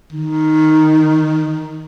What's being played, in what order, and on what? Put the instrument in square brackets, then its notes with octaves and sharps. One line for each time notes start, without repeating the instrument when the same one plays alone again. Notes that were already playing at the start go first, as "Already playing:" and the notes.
[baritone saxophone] D#3